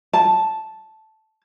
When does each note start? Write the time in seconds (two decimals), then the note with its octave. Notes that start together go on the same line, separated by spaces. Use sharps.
0.13 A5